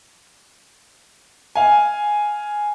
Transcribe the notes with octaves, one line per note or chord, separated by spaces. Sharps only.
F5 G#5